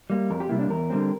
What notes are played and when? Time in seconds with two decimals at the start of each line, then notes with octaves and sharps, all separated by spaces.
0.10 G3 A#3
0.30 F2 A#4
0.40 G4
0.49 C3 G3 A#3 E4
0.59 D4
0.70 E2 A#4
0.90 D3 G3 C4